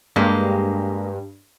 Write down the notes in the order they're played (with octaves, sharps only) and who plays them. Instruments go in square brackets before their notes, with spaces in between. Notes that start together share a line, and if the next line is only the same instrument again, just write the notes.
[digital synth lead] G2 [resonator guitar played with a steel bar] G#3 A#3 G4